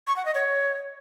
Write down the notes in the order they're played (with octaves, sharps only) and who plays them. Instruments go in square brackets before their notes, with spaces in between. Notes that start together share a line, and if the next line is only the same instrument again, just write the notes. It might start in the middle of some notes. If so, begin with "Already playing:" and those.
[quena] C#6
F#5
D#5
C#5